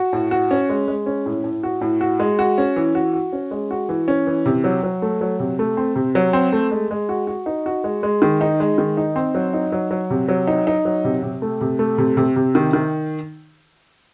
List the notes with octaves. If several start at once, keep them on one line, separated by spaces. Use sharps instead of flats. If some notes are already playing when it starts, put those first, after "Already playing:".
Already playing: F#4
A2
F#4
C#4
G#3
G#3
C#4
A2
A2
F#4
A2
F#4
G#3
F#4
C#4
E3
F#4
F#4
C#4
G#3
F#4
E3
C#4
E3
C3
F#3
F#3
A3
F#3
C3
A3
C4
C3
F#3
C4
A3
G#3
G#3
F#4
F#4
D#4
F#4
G#3
G#3
D#3
D#4
G#3
D#3
D#4
C4
F#3
D#4
F#3
F#3
C3
F#3
D#4
D#4
F#3
C3
C3
A3
C3
A3
C3
C3
C3
D#3
D#3